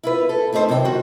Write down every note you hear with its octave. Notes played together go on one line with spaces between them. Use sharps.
E4 F4 B4
A4
A3 C4 D#4 E4 C5
F#2 C3 D#3 A4 G5
G3 F#4